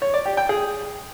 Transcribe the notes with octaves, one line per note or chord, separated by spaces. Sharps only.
C#5
D5
G4
G5
G#4